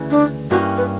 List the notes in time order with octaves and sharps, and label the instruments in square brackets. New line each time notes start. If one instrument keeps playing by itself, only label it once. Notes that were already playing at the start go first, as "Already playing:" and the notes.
Already playing: [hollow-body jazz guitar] D2 C#3 E3
[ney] D4
[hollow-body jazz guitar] G2 E3 A#3 C#4 G4 [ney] F#4
[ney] B4